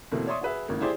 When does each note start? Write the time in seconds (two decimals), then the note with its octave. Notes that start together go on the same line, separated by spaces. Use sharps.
0.12 B2 E3 A3 A#3 C4
0.27 C#5 D5 E5 C6 C#6 D#6
0.41 F#4 G#4 B4 E5
0.68 G#1 A2 C#3 A#3
0.80 E4 G4 G#4 C5 D5